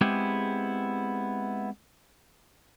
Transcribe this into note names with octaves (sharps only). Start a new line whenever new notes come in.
G#3 B3 C4 E4 G4 G#4